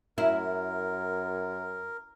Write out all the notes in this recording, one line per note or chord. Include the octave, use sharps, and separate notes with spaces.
F#2 E4 A#4